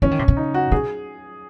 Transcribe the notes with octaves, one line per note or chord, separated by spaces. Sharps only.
E3 C#4
D#3
C3
C#3
D#4
F#4
C#3 G#4